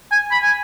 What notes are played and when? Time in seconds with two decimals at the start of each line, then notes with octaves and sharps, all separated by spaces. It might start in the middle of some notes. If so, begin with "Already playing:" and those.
0.12 G#5
0.31 B5
0.43 G#5